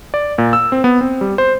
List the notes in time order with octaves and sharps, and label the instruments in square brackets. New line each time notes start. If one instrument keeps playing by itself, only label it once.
[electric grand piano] D5
A#2
E6
C4
B3
C4
G3
C5